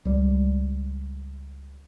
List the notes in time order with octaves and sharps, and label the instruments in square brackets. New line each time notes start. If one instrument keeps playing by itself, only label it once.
[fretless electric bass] C#2 G3